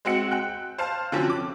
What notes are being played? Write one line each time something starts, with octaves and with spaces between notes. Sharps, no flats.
G#3 C4 F#4 C#7
G5 F#6
C5 F5 A5
D3 F3 F#3 C4 C#4
D6